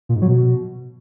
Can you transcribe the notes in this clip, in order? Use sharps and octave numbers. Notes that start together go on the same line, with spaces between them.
A#2
G#2
F#3
B2